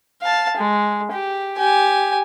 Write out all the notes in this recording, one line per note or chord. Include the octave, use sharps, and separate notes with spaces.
F5 A5
G#3
G4
G4 G#5